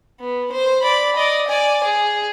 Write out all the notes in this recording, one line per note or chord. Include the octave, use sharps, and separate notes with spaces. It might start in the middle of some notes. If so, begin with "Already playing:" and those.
B3
C5
D5 B5
D5 D#5
D5 G#5
G#4